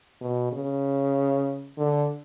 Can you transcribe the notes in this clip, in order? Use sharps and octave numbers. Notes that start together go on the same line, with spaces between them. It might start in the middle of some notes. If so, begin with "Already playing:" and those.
B2
C#3
D3